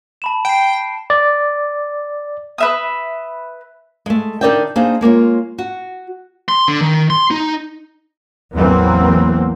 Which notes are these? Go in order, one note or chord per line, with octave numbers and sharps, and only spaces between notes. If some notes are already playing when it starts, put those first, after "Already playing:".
A5 B5 E7
G5 C7 D7
D5
B4 E5 D#6
G#3 A3
D3 D#4 A#4 D5 E5 G5
A#3 C4 D4 D#4 G#4
G#3 A#3 F4 C#5
F#4
C6
D3
D#3
C6
D#4
A1 E2 E3 F#3 A#3 C4